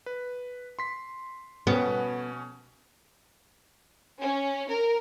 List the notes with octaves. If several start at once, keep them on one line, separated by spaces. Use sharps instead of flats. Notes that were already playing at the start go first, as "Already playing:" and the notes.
B4
C6 B6
B2 B3 C#4
C#4
A#4